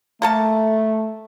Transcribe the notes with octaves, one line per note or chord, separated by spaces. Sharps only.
A3 A#3 A4 A5